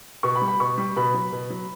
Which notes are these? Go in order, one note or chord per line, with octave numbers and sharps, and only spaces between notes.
B2 C#6
B5
G3
B5
B2 C#6
G3
B2 B5
F#3
B2
F#3